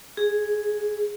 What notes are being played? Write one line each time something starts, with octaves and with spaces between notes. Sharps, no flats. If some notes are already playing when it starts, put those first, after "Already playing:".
G#4